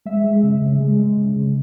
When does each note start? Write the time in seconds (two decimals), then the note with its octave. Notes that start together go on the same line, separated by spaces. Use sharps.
0.05 G#3 E5
0.24 G#3
0.43 C#3
0.61 C#3
0.80 G#3
0.99 G#3
1.17 C#3
1.36 C#3